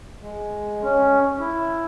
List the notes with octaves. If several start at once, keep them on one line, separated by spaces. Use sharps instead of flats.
G#3
C#4
E4